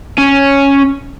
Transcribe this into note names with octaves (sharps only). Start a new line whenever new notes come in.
C#4